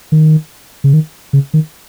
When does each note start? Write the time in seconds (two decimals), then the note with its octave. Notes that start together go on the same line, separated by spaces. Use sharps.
0.12 D#3
0.84 C#3
0.93 D#3
1.33 C#3
1.54 D#3